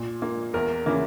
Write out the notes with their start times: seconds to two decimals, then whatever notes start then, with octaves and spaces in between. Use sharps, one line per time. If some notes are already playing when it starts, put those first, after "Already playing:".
Already playing: A#2
0.22 A#3
0.54 E2 A#4
0.86 C#3 E3 A#3